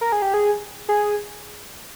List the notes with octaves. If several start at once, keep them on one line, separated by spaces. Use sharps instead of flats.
A#4
G#4
G4
G#4
G#4